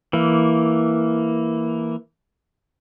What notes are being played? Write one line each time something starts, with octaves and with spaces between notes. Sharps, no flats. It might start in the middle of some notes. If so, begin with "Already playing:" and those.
E3 A#3